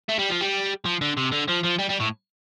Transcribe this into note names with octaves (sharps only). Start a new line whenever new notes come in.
A3
G3
F3
G3
F3
D3
C3
D3
F3
F3
G3
G3
A2